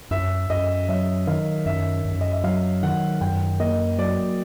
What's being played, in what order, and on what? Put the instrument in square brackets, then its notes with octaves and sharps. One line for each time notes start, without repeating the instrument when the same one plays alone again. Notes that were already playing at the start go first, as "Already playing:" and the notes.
[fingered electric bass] F#2 [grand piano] E5
[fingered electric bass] F#2 [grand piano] D#5
[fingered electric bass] F#3 [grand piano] E5
[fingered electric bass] D#3 [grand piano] F5
[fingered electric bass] F#2 [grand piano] E5
[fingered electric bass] F#2
[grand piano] D#5
E5
[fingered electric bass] F#3 [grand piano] F5
[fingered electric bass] D#3 [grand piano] F#5
[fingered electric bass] F#2 [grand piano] G5
[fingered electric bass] A#3 [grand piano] D#5
[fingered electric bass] F#3 [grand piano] D5